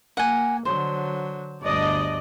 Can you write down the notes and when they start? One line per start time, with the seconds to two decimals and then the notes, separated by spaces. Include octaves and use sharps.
0.17 A#3 F#5 G#5
0.65 D3 F#3 C5
1.61 G1 D2 D4 D5 D#5